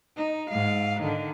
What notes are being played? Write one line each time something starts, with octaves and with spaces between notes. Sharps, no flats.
D#4
G#2 F5
D3 D#3